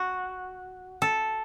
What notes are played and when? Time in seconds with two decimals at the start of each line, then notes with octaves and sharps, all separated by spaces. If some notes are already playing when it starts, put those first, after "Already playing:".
Already playing: F#4
1.02 A4